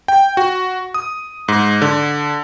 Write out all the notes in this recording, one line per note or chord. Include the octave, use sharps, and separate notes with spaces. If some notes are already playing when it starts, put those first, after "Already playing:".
G5
F#4
D#6
G#2
D3